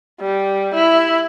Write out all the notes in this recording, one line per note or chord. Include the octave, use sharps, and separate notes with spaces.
G3
E4